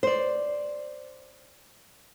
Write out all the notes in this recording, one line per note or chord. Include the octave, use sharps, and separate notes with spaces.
C5 D5